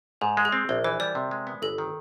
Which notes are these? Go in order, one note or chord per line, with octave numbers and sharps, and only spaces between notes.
G#2 G#4
G#3
G#4
C4
A#1 A#4
E3 C5
G3 D5
C3
G#3
B3
G1 A4
D#3